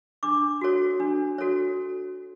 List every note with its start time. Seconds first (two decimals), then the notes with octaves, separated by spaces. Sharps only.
0.23 D4 D6
0.61 F#4 A4 C#5
1.00 D4
1.38 F#4 A4 C#5